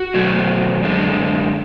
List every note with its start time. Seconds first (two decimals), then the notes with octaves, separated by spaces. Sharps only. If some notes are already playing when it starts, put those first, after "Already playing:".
Already playing: F#4
0.14 B2 F#3 A3
0.83 F#2 D3 G#3